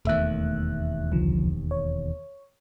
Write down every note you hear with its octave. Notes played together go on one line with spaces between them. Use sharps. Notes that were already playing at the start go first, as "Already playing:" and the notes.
E1 D#2 A3 E5 F#6
C2 D3 F3
C#5